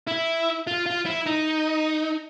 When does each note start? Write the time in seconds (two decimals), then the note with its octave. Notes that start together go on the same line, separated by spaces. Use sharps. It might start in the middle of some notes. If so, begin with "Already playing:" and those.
0.07 E4
0.67 F4
0.86 F4
1.06 E4
1.26 D#4